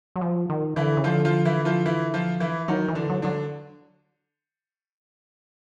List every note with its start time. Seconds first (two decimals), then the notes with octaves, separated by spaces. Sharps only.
0.16 F#3
0.21 F3
0.50 D#3
0.76 D3 E3 E4
0.97 C#3
1.04 D3 F3 F4
1.25 F3 F4
1.45 E3 E4
1.65 F3 F4
1.86 E3 E4
2.14 F3 F4
2.40 E3 E4
2.68 D#3 F#3 D#4
2.88 E3
2.95 D3 D4
3.10 F#3
3.22 D3 F#3 D4